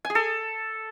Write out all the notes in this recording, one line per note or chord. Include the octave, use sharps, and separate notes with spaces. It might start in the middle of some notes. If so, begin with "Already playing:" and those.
G#5
G#4
A4